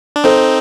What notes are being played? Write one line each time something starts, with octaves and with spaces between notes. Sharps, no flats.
D4
C4 D#4 A4 C5